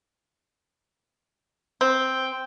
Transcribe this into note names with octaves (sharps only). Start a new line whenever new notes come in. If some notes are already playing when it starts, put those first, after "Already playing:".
C4 G5